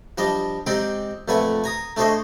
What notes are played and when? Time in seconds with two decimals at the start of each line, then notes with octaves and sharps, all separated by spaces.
0.18 F3 G3 D4 D#5
0.67 G#3 C4 D#4 G4 G#4 D5
1.28 F2 A#2 A3 B4 F#5 G#5
1.64 G#5 A#5 D#6
1.97 A3 D4 G#4 C5 C#5 D#5